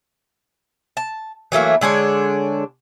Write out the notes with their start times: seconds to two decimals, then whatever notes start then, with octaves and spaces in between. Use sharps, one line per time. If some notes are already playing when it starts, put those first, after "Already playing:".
0.97 A5
1.52 E3 F#3 A3 A#3
1.81 D3 G#3 D4 C#5